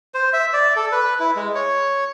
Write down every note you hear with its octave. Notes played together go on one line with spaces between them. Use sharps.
C5
E5
D5
A4
B4
E4
G#3
C#5